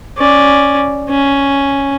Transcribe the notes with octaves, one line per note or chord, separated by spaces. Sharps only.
C#4 D5
C#4